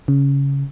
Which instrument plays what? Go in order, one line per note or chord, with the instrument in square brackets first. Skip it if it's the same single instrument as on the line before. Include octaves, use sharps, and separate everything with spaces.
[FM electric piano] C#3